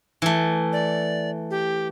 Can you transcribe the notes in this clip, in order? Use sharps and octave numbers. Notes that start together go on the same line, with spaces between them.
E3 A3
D5
G4